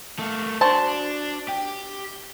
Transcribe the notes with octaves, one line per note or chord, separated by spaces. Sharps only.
A3 A#3
D4 F#4 C5 A5
G4